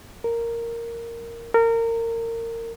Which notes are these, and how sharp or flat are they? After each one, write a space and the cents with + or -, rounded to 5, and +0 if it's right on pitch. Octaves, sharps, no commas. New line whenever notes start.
A#4 -5
A#4 -25